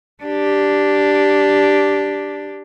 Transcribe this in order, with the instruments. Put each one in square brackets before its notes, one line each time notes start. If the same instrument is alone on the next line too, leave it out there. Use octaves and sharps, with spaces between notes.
[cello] D4 G4